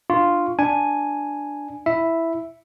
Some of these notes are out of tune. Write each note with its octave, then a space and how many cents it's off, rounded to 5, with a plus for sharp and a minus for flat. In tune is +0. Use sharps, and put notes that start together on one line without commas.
D4 +35 F4 +0 C#6 +5
D4 +0 G#5 +0
E4 +0 E5 +0